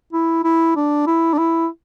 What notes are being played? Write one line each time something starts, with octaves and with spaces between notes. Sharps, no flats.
E4
E4
D4
E4
D4
E4